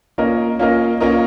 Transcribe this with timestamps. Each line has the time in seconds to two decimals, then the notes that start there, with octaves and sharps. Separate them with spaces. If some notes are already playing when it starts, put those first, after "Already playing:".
0.18 A#3 C#4 F4 A#4 D#5
0.59 A#3 C#4 F4 A#4 D#5
1.00 A#3 C#4 F4 A#4 D#5